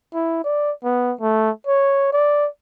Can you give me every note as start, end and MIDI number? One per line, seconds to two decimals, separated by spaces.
0.15 0.44 64
0.44 0.72 74
0.84 1.14 59
1.21 1.51 57
1.67 2.08 73
2.13 2.48 74